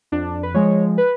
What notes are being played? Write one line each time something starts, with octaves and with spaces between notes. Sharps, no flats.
F2 D4
B4
F3 G#3 C#5
B4